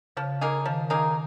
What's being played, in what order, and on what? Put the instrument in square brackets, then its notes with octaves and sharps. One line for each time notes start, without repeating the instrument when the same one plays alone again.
[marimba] C#3 [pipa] F3
[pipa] A#3 D#4 G#4
[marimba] D#3 [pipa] F3
[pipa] A#3 D#4 G#4